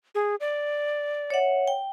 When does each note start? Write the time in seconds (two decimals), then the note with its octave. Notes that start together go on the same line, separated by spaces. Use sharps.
0.15 G#4
0.40 D5
1.30 C#5 E5 F#5
1.68 G5